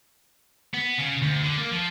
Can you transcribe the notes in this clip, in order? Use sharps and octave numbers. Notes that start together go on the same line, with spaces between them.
B3
C#3
D2
D3
A#3
F3